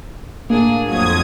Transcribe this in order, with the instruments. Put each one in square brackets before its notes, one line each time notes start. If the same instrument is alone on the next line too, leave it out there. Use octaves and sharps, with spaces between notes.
[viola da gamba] A2 D4 G#4 [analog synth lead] A#3
[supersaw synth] F2 D#6 G#6 [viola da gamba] F#3